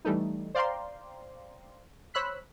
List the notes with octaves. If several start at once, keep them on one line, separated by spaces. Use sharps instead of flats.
E3 G3 A3 D#4
C5 D5 F5 G5 A#5 C6
C5 C#5 B5 E6 F#6 B6